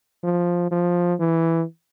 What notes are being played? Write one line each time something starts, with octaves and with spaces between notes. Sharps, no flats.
F3
F3
E3